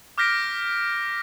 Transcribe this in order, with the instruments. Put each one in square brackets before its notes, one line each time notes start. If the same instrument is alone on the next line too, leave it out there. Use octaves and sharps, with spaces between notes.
[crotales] D6 F6 G6 A#6 B6 D7